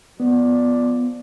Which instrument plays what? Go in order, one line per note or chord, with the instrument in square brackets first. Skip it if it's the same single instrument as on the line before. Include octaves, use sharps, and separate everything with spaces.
[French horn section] F3 F4 D5 [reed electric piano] B3